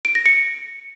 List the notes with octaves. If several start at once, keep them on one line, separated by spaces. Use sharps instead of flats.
D7
A#6
C#7